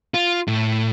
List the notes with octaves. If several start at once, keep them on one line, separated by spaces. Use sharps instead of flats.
F4
A2